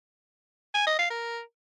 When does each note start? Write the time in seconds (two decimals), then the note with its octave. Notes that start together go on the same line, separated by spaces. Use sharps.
0.75 G#5
0.87 D#5
0.98 F5
1.10 A#4